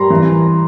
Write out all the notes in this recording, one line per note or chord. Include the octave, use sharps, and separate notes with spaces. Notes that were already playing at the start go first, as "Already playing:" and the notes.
Already playing: G3 A#5 C6
E3